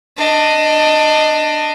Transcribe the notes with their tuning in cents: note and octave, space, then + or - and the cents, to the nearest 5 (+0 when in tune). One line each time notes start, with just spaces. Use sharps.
D4 +20 D#5 +0